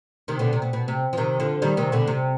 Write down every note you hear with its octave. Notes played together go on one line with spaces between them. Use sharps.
C3 D#3
B2 D3
C3
B2
B2
C3
F3
C3 D#3
D3 F3
D#3 G3
C3 D#3
B2 D3
C3